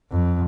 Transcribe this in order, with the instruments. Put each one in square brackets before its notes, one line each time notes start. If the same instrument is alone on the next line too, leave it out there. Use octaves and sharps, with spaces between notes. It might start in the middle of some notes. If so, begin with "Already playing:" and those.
[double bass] F2